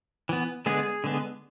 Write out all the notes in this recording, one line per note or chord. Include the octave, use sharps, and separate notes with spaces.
E3 B3
D3 G#3 B3 G#4
D3 G#3 B3